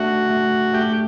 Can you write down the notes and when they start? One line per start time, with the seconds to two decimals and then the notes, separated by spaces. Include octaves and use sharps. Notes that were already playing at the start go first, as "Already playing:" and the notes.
Already playing: A3 D4 F#4
0.29 A3
0.73 A3 G4